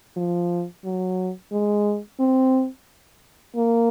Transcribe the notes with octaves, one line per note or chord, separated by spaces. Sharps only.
F3
F#3
G#3
C4
A#3